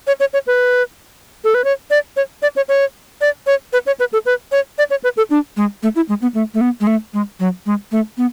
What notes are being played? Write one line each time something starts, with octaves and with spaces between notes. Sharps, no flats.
C#5
C#5
C#5
B4
A4
B4
C#5
D5
C#5
D5
C#5
C#5
D5
C#5
B4
C#5
B4
A4
B4
C#5
D5
C#5
B4
A4
D4
G#3
A3
E4
G#3
B3
A3
A3
B3
G#3
A3
G#3
F#3
G#3
A3
B3